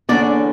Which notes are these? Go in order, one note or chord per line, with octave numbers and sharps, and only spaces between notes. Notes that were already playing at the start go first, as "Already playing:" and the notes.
E2 D3 A#3 C#4 D5